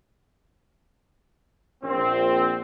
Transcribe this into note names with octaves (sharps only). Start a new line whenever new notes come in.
A#1 C4